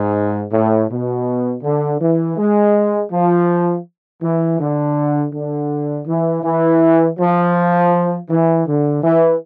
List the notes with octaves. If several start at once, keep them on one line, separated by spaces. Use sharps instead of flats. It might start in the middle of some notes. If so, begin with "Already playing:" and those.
Already playing: G#2
A2
B2
D3
E3
G#3
F3
E3
D3
D3
E3
E3
F3
E3
D3
E3